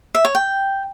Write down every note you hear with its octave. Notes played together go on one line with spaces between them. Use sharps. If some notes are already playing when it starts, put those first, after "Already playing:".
E5
C#5
G5